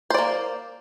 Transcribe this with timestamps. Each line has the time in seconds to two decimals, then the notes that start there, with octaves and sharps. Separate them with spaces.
0.10 C5
0.14 D5
0.18 A#3